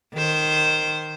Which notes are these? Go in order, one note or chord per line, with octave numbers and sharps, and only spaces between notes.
D#3 C5